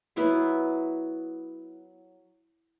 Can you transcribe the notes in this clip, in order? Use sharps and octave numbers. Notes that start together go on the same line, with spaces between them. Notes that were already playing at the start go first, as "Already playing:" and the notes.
F#3 B3 E4 C6